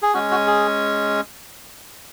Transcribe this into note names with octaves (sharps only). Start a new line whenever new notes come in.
G#4
G#3 C#4 F#4
F#4
G#4